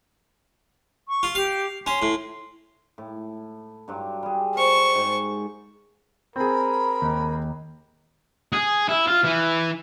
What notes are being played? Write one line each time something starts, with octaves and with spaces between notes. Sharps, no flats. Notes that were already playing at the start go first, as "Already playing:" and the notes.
C#6
F4
G4 F5
C#4 C6
A2
A2
G2 F#3 C6
G3 G#4
A#4 C5 C#6
G#2
C4 G#4 A#4 B5
D#2
G#4
E4
F4
E3